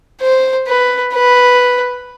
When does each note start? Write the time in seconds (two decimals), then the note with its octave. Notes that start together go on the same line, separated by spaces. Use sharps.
0.22 C5
0.67 B4
1.14 B4